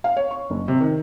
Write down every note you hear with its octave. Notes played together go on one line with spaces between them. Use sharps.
F5
C#5
C#6
F#1
C3
D#3